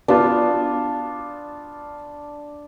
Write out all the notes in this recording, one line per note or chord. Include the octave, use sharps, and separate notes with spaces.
B3 D4 F4